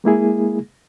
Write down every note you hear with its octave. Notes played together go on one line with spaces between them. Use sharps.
G#3 A#3 E4 G#4